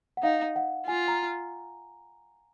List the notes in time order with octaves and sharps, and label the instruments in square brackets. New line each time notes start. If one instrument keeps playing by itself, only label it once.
[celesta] F#5
[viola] D#4 [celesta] F5
[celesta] F#5
[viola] F4 [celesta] G#5
[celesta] A#5